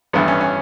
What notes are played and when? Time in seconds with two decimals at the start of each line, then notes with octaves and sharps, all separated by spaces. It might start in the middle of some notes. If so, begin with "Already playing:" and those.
0.13 A1 G2 E3 B3
0.28 C#4
0.41 C#4